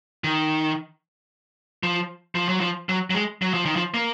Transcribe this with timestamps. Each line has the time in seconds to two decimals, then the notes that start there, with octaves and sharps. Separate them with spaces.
0.24 D#3
1.83 F3
2.35 F3
2.49 F#3
2.60 F3
2.89 F#3
3.10 F#3
3.14 G#3
3.42 F#3
3.54 F3
3.65 D#3
3.76 F3
3.94 A#3